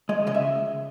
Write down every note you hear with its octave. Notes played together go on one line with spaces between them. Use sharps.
G#3 D#5
C#3 D#5
E5